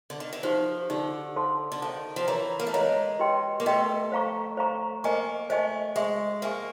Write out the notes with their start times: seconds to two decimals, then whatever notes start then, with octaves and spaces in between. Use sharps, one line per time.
0.10 D3
0.20 D#3
0.33 E3
0.43 F3 D#4 G4 C5
0.90 D3 D#4 G4 C5
1.36 A4 C5 F5 A5 C6
1.72 D3
1.82 D#3 A4 C5 F5 A5 C6
2.16 F3
2.28 E3 A#4 C#5 F5 A#5
2.60 A#3
2.67 A3
2.73 G#3 A#4 C#5 F5 A#5
3.20 G4 B4 D#5 G5 C6
3.60 A#3
3.66 A3 G4 B4 D#5 G5 C6
4.12 C5 F5 A#5 C#6
4.57 C5 F5 A#5 C#6
5.04 A#3 C5 D#5 G#5 C#6
5.50 A3 C5 D#5 G#5 C#6
5.96 G#3 C5 E5 G#5 C#6
6.42 A#3 C5 E5 G#5 C#6